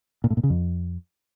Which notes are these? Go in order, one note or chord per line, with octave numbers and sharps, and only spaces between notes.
A#2
A2
A#2
C#3
F2